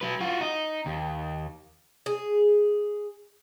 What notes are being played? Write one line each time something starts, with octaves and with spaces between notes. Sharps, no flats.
F#3 B4
F4 F#4
D#4
D#2
G#4